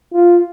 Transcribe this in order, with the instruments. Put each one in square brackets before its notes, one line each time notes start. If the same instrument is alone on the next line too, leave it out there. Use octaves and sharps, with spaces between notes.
[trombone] F4